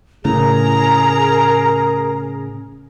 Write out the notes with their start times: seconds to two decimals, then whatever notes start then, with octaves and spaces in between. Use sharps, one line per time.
0.25 A2 C#3 G#4 A#4 A#5